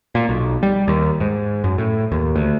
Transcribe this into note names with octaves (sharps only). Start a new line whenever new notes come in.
A#2
B1
G3
D#2
G#2
F#2
A2
D#2
D2